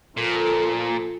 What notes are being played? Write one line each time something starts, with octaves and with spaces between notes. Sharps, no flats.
A#2 F3 A4